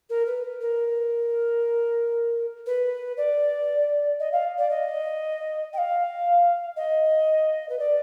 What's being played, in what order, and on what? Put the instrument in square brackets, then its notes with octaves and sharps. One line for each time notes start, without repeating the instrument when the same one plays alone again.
[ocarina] A#4
B4
A#4
B4
D5
D#5
F5
D5
D#5
G5
F5
D#5
B4
D5